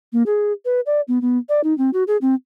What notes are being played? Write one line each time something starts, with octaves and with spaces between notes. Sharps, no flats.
A#3
G#4
B4
D5
B3
B3
D5
D#4
C4
F#4
G#4
C4